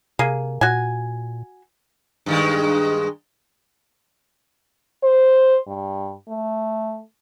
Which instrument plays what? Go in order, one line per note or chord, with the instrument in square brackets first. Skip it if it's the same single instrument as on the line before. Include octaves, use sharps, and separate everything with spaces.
[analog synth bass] C3 [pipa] A#3 G#4
[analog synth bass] A#2 [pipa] F#4 G#5
[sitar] G2 D#3 G#3
[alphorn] C5
G2
A3